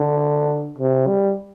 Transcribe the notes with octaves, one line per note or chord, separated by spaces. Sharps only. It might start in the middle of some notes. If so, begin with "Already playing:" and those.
Already playing: D3
C3
G3